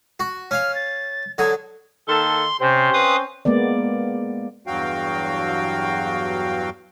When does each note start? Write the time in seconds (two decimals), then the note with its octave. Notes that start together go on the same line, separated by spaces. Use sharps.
0.20 F#4
0.51 C#4 F5 F6
0.75 A6
1.38 D3 F#3 D#6 G#6
2.08 D#3 A#3 A4 C6
2.61 C3 C4 C#4 C5
2.93 B4 F5 D#6
3.45 G#3 A#3 B3 D5
4.67 E2 G2 F#3 F#4 F5 G5